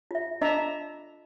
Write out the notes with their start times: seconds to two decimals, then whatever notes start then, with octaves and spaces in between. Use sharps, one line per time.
0.11 F4 E5
0.41 D4 D#5 E5 A#5